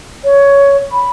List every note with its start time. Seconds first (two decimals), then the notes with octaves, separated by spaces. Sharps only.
0.24 C#5
0.92 B5